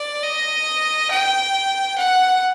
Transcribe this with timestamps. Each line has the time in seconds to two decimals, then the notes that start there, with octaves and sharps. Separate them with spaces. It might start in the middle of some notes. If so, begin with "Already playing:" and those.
Already playing: D5
0.23 D#5
1.10 G5
1.98 F#5